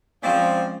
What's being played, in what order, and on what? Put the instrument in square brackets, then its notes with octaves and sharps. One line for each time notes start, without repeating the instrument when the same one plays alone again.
[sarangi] F3 [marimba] G#3 C#4 G#4 [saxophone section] C4 D5 D#5 [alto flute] F5